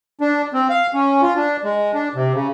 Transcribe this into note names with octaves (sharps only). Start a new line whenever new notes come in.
D4
C4
F5
C#4
F4
D4
G#3
D4
C3
C#3